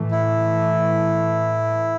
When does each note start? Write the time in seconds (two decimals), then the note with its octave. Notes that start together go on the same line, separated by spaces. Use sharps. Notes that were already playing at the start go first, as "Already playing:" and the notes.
Already playing: A2 E3 A3
0.11 E4